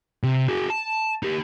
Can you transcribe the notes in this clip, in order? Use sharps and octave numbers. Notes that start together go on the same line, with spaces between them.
C3
F#4 G#4
A5
D#4 G4